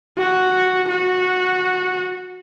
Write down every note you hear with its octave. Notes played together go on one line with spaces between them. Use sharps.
F#4
F#4